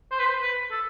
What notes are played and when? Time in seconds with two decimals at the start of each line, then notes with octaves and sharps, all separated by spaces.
0.11 C5
0.19 B4
0.26 C5
0.42 B4
0.71 A4